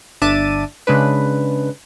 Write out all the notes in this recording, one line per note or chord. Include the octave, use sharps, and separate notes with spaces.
G1 D4 E5 A5 D6 D#7
C#3 G#3 D4 B4